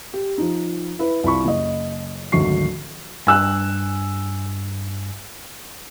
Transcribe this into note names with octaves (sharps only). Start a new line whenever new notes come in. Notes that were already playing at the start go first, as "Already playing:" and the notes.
G4
F3 D#4
E4 B4
C2 F4 B5 C#6
F#1 D#5
G#1 D2 F#3 F#4 C#6 C7
G2 G#5 E6 F#6